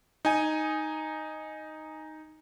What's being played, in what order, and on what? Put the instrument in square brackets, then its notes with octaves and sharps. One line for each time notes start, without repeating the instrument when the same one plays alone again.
[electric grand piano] D#4 G#5